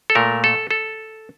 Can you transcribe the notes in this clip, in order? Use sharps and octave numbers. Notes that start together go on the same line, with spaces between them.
A4
A#2 A3 A#4
A4
A4